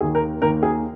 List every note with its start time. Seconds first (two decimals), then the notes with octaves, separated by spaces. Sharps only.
0.01 D#2 D#3 A#3 G#4
0.15 A#4
0.41 D#2 D#3 A#3 A#4
0.63 G#4